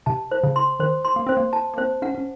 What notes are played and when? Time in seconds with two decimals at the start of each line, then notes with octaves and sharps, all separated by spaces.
0.06 C3 A5
0.31 C5
0.43 C#3
0.56 C6
0.80 D#3 C5
1.05 C6
1.16 A#3
1.27 C4 C5
1.37 A#3
1.53 A5
1.74 A#3
1.78 C4 C5
2.02 C#4 F#5
2.15 C#4